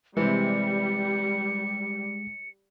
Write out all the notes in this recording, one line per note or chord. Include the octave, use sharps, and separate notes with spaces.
C3 E3 G3 G#3 C#7